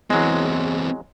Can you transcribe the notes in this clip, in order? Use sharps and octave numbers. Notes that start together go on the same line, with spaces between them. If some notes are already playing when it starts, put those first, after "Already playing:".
E2 E3 F#3 G#3 C4